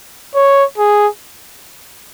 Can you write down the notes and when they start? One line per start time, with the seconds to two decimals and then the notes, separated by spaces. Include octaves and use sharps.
0.35 C#5
0.78 G#4